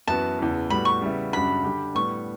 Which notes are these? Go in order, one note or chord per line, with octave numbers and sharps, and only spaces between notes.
F#2 E3 B3 F#4 A5
E2 C#3 E3
A2 G3 B3 F#4 B5
C#6
C#3 G3 B3 E4
F#2 C#3 G3 D4 F#4 B5
D3 G3 D4 G4
A2 G3 B3 C#6